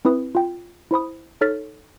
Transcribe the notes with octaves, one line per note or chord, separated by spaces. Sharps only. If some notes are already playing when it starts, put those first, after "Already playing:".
C4 E4 B4 D#6
F4 G5
E4 C5 B5 D#6
D#4 A4 C#5 F6 A6 B6